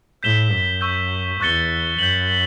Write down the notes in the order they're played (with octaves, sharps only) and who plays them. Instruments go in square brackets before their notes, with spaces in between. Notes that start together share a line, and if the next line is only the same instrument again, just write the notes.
[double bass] A2 [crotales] G6 B6 E7 G7
[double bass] F#2
[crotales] C#6 E6 G6
[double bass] E2 [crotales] C#6 F#6 A6 C#7 G7
[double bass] F#2 [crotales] G6 B6 F#7